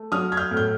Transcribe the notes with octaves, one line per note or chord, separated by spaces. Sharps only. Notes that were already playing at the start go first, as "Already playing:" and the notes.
Already playing: A3
F#3 D#6 F6
G#6
F6 G6
A2
G6